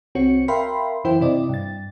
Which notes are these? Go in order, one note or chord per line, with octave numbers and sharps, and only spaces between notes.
C2 C4 F#4 C#5 C#7
A#4 E5 F5 G5 B5 C6
F#2 E3 E4 C5 G5
C3 E4 D5 D#5
G2 A6